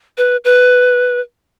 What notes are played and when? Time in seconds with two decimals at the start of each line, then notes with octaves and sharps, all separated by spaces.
0.18 B4
0.44 B4